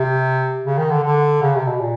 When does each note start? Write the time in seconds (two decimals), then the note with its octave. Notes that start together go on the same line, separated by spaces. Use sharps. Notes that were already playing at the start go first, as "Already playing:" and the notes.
Already playing: C3
0.66 C#3
0.78 D#3
0.91 D3
1.04 D3
1.42 C#3
1.55 C3
1.68 B2
1.81 A#2